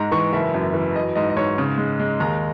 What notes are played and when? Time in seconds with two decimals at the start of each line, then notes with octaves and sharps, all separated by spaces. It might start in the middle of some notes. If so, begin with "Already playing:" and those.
Already playing: G#2 G#3 A#5
0.12 E3 C#6
0.33 F#1 E5
0.54 F#2
0.74 E3
0.96 F#3 D#5
1.15 G#2 D#5
1.30 D#5
1.37 G#2 C#5
1.58 C#3
1.78 G#3
2.00 G#3
2.20 D#2 A#5